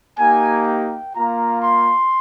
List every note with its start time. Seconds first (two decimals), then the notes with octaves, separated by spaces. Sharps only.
0.17 A#3 D#4 G4 G#5
0.66 G5
1.14 A#3 F4 A#5
1.62 C6